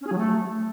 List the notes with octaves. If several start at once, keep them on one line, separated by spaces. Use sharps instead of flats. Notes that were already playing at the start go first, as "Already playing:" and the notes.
C#4
G#4
F#3
A3